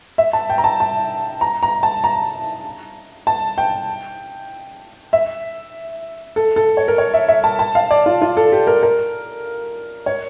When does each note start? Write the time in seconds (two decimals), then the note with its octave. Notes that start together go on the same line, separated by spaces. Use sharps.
0.18 E5
0.33 A5
0.50 G5
0.58 A#5
0.64 A5
0.80 A5
1.41 A#5
1.63 A#5
1.83 A5
2.04 A#5
3.27 A5
3.58 G5
5.13 E5
6.36 A4
6.56 A4
6.77 C#5
6.88 A#4
6.98 C#5
7.14 E5
7.28 E5
7.44 A5
7.59 A5
7.75 F5
7.91 D5
8.06 F4
8.22 F4
8.37 A4
8.52 G4
8.67 A#4
8.83 A#4
10.06 C#5